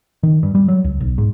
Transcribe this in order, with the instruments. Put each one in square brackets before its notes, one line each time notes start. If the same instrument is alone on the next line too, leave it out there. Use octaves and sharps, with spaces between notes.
[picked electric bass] D#3
G2
G3
F#3
C#2
B1
G#2